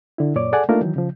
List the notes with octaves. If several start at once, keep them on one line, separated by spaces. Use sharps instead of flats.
D3 E4
F#2 A#2 C#5 D5 D6
G#4 A4 D5 F#5 G#5
A3 A#3 D4 D#4 F4 A#4
D#3 E3 F#3
C#3 F3